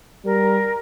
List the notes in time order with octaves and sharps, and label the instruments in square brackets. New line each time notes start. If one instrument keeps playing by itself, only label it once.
[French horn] G3 [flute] A#4